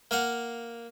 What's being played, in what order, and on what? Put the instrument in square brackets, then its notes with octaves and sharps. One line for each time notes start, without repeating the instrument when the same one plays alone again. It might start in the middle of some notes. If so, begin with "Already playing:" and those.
[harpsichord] A#3 F5 F#5